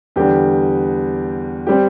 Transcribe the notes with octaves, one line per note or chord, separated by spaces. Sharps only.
E2 D3 G3 G4
G3 C4 G4